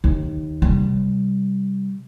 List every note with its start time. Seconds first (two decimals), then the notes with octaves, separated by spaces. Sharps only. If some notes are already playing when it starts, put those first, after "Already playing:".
0.04 D#2
0.62 C3 G3